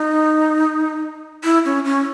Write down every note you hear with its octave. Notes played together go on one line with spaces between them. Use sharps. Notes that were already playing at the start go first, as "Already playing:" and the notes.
Already playing: D#4
E4
C#4
C#4